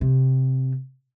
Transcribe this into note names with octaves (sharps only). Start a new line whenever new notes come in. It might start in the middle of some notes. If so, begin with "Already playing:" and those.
C3